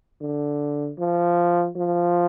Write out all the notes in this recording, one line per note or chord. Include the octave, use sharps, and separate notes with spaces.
D3
F3
F3